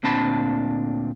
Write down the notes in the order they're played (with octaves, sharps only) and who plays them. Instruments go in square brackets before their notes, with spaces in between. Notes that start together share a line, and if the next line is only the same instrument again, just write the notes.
[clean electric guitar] D2 A#2 C4 D4 A5 B5